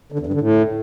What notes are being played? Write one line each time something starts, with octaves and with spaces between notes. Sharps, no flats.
D3
E2
G2
D3
A2